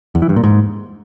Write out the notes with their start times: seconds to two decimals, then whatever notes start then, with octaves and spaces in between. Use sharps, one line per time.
0.15 E2
0.22 E3
0.29 G2
0.36 A#2
0.44 G#2